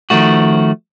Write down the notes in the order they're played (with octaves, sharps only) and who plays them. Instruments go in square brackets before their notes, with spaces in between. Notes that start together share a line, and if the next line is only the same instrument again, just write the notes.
[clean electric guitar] D#3 F3 A3 F#4